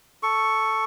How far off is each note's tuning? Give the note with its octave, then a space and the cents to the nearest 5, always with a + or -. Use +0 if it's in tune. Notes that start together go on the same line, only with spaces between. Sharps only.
A4 +0 C#6 +0